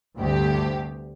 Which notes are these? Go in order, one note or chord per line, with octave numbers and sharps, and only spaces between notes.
D2 G2 C3 G4